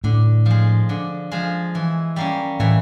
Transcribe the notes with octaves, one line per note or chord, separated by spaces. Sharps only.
A2 D3
F3 G#3
D3
F3 G#3
E3
G3 A#3 C#4
A2 E3